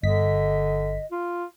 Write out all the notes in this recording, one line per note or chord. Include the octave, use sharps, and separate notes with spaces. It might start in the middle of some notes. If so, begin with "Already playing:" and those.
G1 D3 D#5 B6
F4